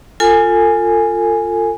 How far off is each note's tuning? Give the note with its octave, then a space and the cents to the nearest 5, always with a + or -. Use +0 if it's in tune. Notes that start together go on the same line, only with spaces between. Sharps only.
F4 +0 A4 +35 G#5 +0